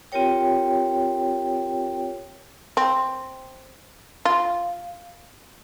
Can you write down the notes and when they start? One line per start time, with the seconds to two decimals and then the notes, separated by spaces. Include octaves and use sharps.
0.12 C4 F4 G4 A#4 C#5 G5
2.77 C4
4.25 F4